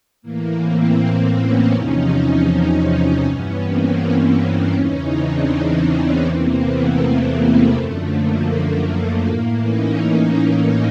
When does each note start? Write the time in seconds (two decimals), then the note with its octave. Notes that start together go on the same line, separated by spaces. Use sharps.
0.22 A2 E3 A#3
0.60 A#3 C4
1.35 B3 C#4
1.73 E2 C3 F3 C#4 D#4
3.23 G2 E3 B3 C#4
3.61 A#3 C4
3.98 B3 C#4
4.74 E2 C#3 E3 C#4 D#4
5.11 C4 D4
5.87 B3 C#4
6.24 E2 C3 E3 A#3 C4
6.61 A3 B3
7.00 A3
7.75 F#2 D3 F3 A3
8.12 A#3
9.25 A2 E3
9.62 C#4 D#4
10.00 C#4 D#4